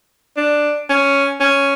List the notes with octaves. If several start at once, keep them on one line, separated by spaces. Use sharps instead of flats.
D4
C#4
C#4